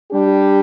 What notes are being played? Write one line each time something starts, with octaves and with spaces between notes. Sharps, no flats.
G3 D4 G4